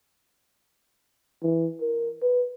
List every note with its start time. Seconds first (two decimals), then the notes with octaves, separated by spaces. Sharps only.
1.43 E3
1.81 A#4
2.22 B4